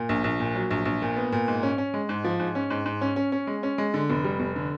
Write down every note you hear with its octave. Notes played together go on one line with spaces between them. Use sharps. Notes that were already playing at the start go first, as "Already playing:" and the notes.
Already playing: A#2
A#1
A#1
A#2
F#3
A#1
A#1
A#2
B3
A#2
G#2
C#4
C#4
G#3
G#2
F3
G#2
C#4
G#2
G#2
C#4
C#4
C#4
G#3
C#4
G#3
D3
F1
G3
F1
D3